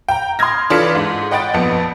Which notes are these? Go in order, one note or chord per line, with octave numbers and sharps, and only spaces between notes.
G5 A#5
C6 D#6 F6 G#6 A#6
E3 D4 F4 A4 B6 C#7
G#2
D#5 F#5 G5 B5 A6 D7
A#1 F2 B3 C#7